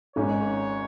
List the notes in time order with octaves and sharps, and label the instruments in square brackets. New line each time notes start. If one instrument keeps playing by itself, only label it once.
[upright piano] G#1 G#2 G#3 C#4 [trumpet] C#5